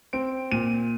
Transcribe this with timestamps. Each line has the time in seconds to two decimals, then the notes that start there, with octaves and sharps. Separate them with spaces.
0.13 C4 D7
0.52 A#2 D#7